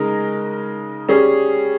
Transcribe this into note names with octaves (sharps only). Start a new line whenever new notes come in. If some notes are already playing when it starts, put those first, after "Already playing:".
Already playing: C#3 G#3 D#4 A#4
G3 C#4 G#4